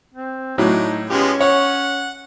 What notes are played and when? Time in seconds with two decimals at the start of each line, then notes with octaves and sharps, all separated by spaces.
0.14 C4
0.58 A2 F#3 D4 D#4
1.10 F3 G#3 B3 C#4 G4
1.41 C#5 F#5